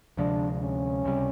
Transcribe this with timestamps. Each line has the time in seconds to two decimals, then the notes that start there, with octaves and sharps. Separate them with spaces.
0.17 D2 C3 F3 G#3 D4
0.61 C#4
1.04 C#2 C3 E3 G3